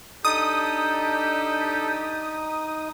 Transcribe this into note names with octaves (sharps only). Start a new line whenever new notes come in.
D4 D#4 G4 A4 D#6